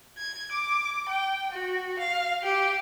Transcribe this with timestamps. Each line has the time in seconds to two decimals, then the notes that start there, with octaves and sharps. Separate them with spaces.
0.18 G#6
0.52 D6
1.09 G5
1.52 F#4
1.99 F5
2.43 G4